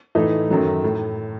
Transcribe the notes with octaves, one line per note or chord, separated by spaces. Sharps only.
A2 E3 A3 D#4
F#2 D#3 F#3 A3
A2